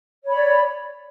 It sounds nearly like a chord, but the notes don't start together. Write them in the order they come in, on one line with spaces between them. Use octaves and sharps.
C#5 B5 D5